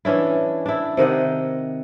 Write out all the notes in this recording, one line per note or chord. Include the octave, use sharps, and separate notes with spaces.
E3 C#4 D4 E4
D4 E4
C3 D#3 D#5 F#5